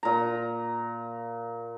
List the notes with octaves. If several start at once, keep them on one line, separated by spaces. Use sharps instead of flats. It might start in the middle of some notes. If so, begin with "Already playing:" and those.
A#2 A#5